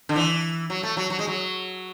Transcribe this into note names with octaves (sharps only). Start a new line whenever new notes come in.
D3
E3
F#3
A3
F#3
F#3
G#3
F#3